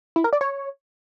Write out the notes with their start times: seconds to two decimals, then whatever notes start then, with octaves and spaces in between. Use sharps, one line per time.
0.16 E4
0.24 A#4
0.33 D5
0.41 C#5